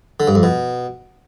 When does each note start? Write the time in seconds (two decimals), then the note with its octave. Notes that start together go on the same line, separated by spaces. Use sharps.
0.20 D3
0.28 G2
0.35 F2
0.43 B2